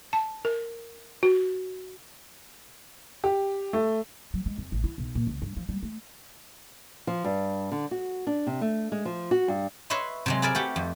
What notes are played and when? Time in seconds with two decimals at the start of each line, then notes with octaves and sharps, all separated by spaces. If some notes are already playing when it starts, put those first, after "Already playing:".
0.13 A5
0.45 A#4
1.23 F#4
3.24 G4
3.73 A3
4.34 F#3
4.46 G#3
4.58 F2
4.72 A1
4.84 E4
4.98 B1
5.15 A#2
5.27 C#2
5.42 G2
5.57 F3
5.69 G3
5.83 A3
7.07 F3
7.24 G2
7.72 D3
7.91 F#4
8.27 D4
8.47 C3
8.61 A3
8.92 G#3
9.05 F3
9.31 F#4
9.48 G2
9.90 B4 C#5 D#5 E5 C6
10.26 C3 F#3 G#3
10.42 G#4 A#4 B4 D5 E5 G#5
10.55 A3 F#4 G4
10.76 F2